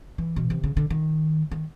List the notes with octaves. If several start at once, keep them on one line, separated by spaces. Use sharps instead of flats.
E3
B2
C3
C#3
D3
D#3
D#3